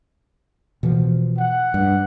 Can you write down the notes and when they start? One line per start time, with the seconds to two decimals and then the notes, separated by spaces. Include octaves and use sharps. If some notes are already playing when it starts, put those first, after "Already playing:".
0.83 B2 E3 F3
1.39 F#5
1.74 G2